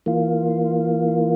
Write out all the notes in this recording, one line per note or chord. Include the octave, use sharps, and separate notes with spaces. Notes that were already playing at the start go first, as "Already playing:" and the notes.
E3 A#3 F4